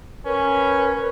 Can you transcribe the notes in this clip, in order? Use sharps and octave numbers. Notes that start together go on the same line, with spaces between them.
C#4 A#4 B4